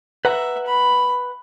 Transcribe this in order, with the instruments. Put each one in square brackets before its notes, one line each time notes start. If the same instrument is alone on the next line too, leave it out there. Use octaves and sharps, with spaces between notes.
[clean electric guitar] B4 F#5 A#5 [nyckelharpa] E5
[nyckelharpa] B5